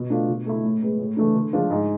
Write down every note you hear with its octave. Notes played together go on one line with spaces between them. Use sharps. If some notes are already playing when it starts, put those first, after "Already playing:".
Already playing: B2
A3 D4 F4
B2
A3 E4
A2
G#3 B3
A2
E3 A3 D4
D3
F3 G#3 D4 F4
G#2